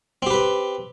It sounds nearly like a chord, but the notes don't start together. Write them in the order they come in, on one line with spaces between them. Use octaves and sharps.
C4 G4 B4